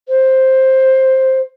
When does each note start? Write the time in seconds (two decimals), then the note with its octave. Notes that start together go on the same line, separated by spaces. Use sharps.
0.08 C5